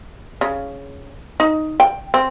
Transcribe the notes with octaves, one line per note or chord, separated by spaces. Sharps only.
C#3
D#4
G5
C4